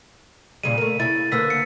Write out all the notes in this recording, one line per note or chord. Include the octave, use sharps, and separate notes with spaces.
A#2 C#3 G3 D#7
A3 A#3
C#3 E4 A6
D3 A#3 B3 E6 B6
C#7